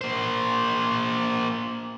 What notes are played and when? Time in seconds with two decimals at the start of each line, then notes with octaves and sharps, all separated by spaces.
0.01 A#3 C5